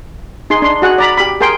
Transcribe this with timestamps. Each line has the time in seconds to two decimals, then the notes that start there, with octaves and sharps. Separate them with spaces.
0.50 D#4 G#4 C6
0.62 D4 C6
0.82 F#4 G#4 F#5
0.98 D5 A#5 B5
1.17 G4 B5
1.41 G#4 A#4 G5 C6